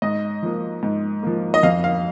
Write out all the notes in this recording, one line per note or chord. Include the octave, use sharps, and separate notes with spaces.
G#2 D#5
F3 A#3
G#2
F3 A#3
D#5
F2 F5
F5